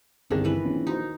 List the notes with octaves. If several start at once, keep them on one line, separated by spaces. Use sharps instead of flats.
G1 C2 D#3 D4 G#4 A#6
D#3 E3 B4
A#1 C4 C#4
D#4 F#4 C5